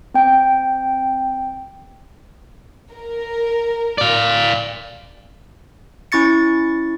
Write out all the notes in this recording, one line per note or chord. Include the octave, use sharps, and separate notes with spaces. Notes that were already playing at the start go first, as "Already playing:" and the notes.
C4 G5
A#4
D5 F5
C#4 E4 C#6 A6 C#7